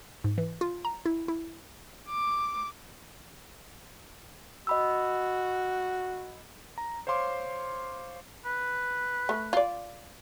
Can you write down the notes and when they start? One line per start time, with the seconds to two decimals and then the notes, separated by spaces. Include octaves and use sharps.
0.24 G#2
0.38 E3
0.61 F4
0.85 A#5
1.06 E4
1.28 E4
2.10 D6
4.67 F#4 D#5 B5 E6
6.78 A#5
7.07 C5 C#5 F5 C6 D6
8.45 B4
9.29 A3
9.53 F4 D5